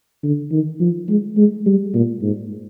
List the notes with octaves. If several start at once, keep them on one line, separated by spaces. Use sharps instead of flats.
D3
D#3
F3
G#3
G#3
G3
A#2
G#2